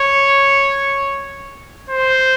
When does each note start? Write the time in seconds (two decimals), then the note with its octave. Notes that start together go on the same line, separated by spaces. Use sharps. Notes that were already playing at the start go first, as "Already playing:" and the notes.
Already playing: C#5
1.90 C5